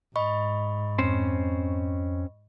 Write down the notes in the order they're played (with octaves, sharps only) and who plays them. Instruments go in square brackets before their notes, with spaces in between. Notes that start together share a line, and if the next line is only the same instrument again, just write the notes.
[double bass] G#2 [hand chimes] D#5 B5 C#6
[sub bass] F2 [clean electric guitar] C4 C#4 C5